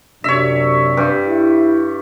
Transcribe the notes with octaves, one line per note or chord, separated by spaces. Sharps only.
F#2 C3 D4 C#5 E5
G2
E4